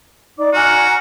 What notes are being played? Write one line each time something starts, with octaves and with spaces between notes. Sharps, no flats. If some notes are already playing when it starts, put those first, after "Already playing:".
D#4 D5 D6
F#4 G#5 A#5 F6